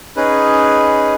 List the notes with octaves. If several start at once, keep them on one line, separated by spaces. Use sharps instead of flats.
C#4 D#4 G#4 B4